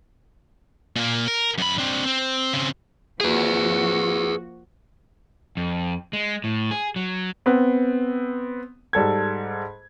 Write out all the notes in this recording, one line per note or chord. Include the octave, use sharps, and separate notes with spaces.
A#2 A#3
A#4
F#2 B5
C4 D4
C4
C#3 C4
F3 A#3 F#4 G#4 B4
F2
G#3
A2
G#4
F#3
B3 C4
G#2 G3 A4 G#6